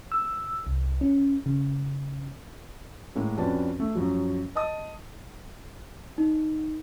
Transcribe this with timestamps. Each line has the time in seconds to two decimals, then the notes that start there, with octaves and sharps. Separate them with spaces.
0.12 E6
0.67 C2
1.01 C#4
1.46 C#3
3.15 A2 G#3 A#3
3.37 F2 C#4 D4 F#4 B4 A5
3.80 A3
3.95 F#2 F3 F#3
4.55 D#5 A5 D#6
6.18 D#4